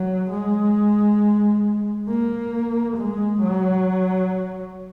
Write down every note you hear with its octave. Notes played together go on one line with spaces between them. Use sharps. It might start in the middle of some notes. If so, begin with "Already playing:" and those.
Already playing: F#3
G#3
A#3
G#3
F#3